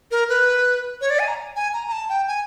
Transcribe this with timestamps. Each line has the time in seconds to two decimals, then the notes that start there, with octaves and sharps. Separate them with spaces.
0.11 A#4
0.29 B4
1.01 C#5
1.10 D5
1.19 G#5
1.28 A#5
1.56 G#5
1.74 A#5
1.87 A#5
1.92 A5
2.09 G5
2.28 G#5